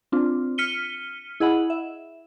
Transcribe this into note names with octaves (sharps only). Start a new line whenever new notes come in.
C4 D4 F4
F6 B6 C#7 D#7 G7
E4 G#4 D#5 F#5 B5
E5